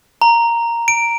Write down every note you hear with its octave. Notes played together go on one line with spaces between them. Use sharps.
A#5
D7